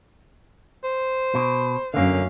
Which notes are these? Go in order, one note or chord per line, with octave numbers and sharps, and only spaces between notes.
C5
B2
F#2 D3 A#3 C#4 F5